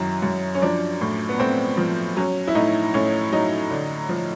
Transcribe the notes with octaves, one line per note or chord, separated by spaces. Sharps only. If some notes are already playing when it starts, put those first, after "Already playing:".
Already playing: F#2 D#3 F#3 E4
F#2
C#4
F3 D4
A2
B3
A2 C4
F3
F#3 C#4
E4
A2 D#4
A2 C#4
F#3 D#4
D3
F3